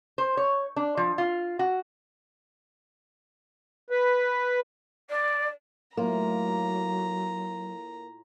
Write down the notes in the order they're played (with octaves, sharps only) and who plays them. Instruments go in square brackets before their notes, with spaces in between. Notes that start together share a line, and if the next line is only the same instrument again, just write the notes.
[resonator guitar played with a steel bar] C5
C#5
D4
F3
F4
F#4
[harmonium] B4
[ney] D5
[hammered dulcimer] A2 F4 [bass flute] F#3 [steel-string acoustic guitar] A#3 [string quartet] A#5